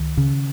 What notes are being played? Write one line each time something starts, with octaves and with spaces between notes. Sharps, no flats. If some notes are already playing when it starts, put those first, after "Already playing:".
Already playing: C#2 D#3
C#3